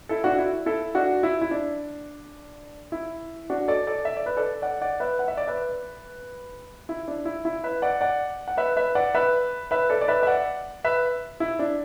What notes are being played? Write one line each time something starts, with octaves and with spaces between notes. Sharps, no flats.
E4 A4
D4 F#4
E4
E4 A4
D4 F#4
E4
E4
D4
E4
D4 F#4
A4 D5
A4 D5
E5
D5
B4
A4 D5
D5 F#5
D5 F#5
B4 E5
F#5
E5
D5
B4 E5
E4
D4
E4
E4
B4 E5
D5 F#5
D5 F#5
F#5
B4 E5
B4 E5
D5 F#5
B4 E5
B4 E5
A4 D5
D5
B4 E5
E5
D5 F#5
B4 E5
E4
D4